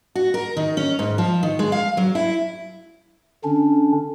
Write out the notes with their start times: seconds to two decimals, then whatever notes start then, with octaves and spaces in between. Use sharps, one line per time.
0.15 F#4
0.34 A#4
0.57 D#3
0.77 C#4
0.99 G#2
1.18 F3
1.43 D#3
1.59 G#3
1.72 F5
1.97 F#3
2.15 E4
3.44 D3 C#4 D4